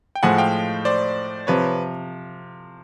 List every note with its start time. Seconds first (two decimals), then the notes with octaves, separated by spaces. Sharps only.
0.15 G5
0.23 A2 F3 G#3 F#5 G#5
0.38 F5 G5
0.85 C5 D5
1.47 C3 F3 B4 C#5